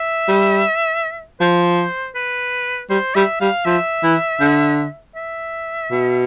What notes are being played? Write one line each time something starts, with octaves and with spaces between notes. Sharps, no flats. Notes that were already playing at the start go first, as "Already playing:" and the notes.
Already playing: E5
G3
F3 C5
B4
G3 C5
G3 E5
G3 F5
F3 E5
E3
D3
E5
B2